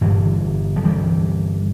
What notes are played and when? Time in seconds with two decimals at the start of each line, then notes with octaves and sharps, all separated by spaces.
0.01 G2 D3 E3 G3
0.76 F3
0.84 E3 G3